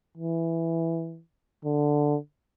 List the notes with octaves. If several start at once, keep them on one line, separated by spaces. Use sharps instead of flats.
E3
D3